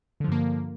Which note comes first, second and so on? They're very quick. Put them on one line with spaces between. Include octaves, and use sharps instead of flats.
D3 F3 G2 A#3